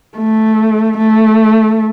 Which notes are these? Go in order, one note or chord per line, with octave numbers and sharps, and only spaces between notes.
A3
A3